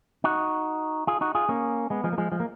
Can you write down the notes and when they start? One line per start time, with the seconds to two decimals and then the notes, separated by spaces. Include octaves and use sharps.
0.24 D#4 F#4
1.07 F4 G#4
1.21 D#4 F#4
1.35 F4 G#4
1.49 A#3 C#4
1.90 G#3 B3
2.04 F3 G#3
2.13 A#3
2.18 F3 G#3
2.32 F3 G#3
2.40 A#3